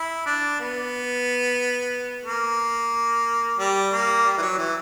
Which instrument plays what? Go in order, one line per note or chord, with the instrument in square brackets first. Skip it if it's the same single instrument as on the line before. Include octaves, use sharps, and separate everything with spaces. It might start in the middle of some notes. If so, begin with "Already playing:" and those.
Already playing: [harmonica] E4
D4
B3
A#3
G3
A#3
G3
E3
F#3
E3